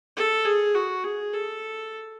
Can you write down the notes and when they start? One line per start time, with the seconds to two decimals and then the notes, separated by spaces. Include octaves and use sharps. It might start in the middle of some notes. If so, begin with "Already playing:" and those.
0.16 A4
0.45 G#4
0.75 F#4
1.04 G#4
1.33 A4